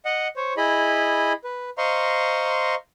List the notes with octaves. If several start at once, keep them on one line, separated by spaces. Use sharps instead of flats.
D#5 F#5
C5 C#5
E4 G#4 D#5 B5
B4
C5 D#5 F5 A#5 C6 C#6